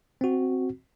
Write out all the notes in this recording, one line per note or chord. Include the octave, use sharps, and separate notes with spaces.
C4 F#4